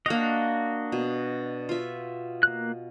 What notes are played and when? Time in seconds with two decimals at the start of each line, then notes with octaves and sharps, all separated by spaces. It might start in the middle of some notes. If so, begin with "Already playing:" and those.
0.06 A#3 D4 F#4 D#5 F5
0.92 B2
1.69 F4 E5
2.43 A#3 F#6